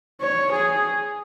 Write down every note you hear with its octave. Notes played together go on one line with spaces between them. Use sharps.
C#5
G#4